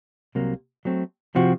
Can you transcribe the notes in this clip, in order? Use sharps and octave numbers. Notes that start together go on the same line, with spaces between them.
C2 C3 F#3 A#3
F#3 A3 C4
C3 F3 C4 F#4